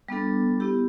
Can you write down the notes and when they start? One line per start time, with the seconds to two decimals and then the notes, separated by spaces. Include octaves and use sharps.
0.08 G3 B3 D4 A4
0.60 B3 E4 G4